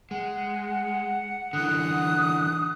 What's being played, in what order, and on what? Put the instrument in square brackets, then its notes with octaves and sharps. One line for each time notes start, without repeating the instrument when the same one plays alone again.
[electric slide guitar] G#3 [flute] F#5
[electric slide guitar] D3 E3 [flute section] D#6 F#6